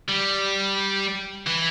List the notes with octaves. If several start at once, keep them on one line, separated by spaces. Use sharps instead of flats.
G3
E3